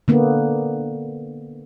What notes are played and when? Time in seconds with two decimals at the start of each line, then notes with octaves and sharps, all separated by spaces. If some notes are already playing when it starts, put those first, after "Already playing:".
0.08 D3 A#3 B3